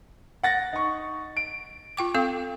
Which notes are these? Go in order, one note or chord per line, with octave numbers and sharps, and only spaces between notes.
F#5 A6 A#6
D#4 C#6
D7
F4 G5 D6
C4 A4 F5